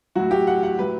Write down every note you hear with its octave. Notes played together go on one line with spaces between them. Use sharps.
A2 F#3 F#4
G4
F#5
F#5
A2 F#3 B4